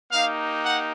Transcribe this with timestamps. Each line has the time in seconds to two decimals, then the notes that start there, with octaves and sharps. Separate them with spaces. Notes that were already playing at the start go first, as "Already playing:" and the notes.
0.12 A#3 D#4 G4 F5
0.64 F#5